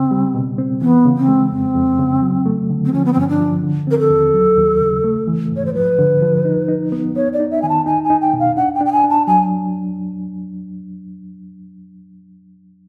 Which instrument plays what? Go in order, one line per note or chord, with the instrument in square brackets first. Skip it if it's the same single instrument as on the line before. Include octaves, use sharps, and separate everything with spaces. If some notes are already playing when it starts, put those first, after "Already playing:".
Already playing: [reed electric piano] C#3 [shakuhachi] C4
[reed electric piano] G3
B2
C4
[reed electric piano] E3 [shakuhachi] B3
[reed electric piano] C#3
[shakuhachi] C4
[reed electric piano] G#3
[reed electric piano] F2 [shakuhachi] C4
[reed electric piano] F2
C#3
F#3
A3
D3
[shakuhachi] C4
[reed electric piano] F3 [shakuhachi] C#4
[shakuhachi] B3
C4
[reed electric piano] G2 [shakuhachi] C#4
[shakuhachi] D4
[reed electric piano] F3
D3
[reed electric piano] C4 [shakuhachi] A#4
[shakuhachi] A4
[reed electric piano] D#2
F#3
D#2
C#3
A3
E3
[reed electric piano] G#2 [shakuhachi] C#5
[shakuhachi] C5
[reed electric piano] F3 [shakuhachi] B4
[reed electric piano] D3
F3
D#4
D#4
B3
[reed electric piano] B3 [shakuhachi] C#5
[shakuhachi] D5
[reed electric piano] D#4
[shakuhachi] E5
[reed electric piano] D#3 [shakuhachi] G#5
[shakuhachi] A5
[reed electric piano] D#4 [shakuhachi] G#5
[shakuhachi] G#5
[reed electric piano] D#4
[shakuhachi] G5
[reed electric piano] B2
[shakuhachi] F5
[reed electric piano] D4 [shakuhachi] F#5
[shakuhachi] G5
[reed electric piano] D4
[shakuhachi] G5
G#5
[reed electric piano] D4
[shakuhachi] A5
[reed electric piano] F#3 [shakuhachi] G#5